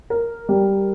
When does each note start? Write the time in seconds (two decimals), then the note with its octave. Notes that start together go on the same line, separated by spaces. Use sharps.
0.10 A#4
0.49 G3